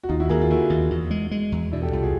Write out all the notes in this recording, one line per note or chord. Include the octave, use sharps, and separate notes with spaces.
F#4
D#2 D#4 F4
E4 F#4
D#2 G#4 A#4
F4
D3 E4 F#4
D#2
E2
G#3
G#3
E2
B2 D4 E4
G4 A4
C2 F4 G4
F#4 G#4